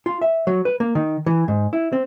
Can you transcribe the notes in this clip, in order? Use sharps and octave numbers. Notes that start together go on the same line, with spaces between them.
F4
E5
F#3
B4
A#3
D#3
E3
G#2
E4
C4